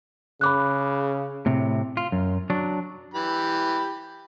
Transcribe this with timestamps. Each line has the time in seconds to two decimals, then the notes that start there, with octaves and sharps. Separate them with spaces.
0.41 C#3 B5 D6 F#6
1.46 A2 C3
1.97 F4
2.12 F#2
2.50 F#3 D4
3.14 E3 G4 B5